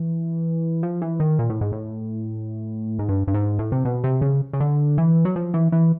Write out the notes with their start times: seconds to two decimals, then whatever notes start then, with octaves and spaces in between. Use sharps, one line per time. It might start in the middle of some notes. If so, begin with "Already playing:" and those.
Already playing: E3
0.83 F3
1.01 E3
1.20 D#3
1.39 A#2
1.49 A2
1.61 G#2
1.72 A2
2.99 G#2
3.09 G2
3.27 G2
3.34 G#2
3.59 A2
3.72 C3
3.85 B2
4.04 C3
4.21 C#3
4.53 C#3
4.60 D3
4.98 E3
5.25 F#3
5.36 F3
5.54 E3
5.72 E3